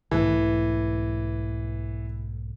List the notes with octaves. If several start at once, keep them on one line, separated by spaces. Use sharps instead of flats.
B1 G#2 E3 A3